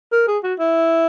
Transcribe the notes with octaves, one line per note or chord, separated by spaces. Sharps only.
A#4
G#4
F#4
E4